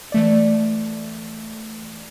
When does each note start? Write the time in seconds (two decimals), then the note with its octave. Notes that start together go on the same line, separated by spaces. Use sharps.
0.12 E3 A3 D5